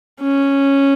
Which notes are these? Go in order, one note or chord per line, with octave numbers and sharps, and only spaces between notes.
C#4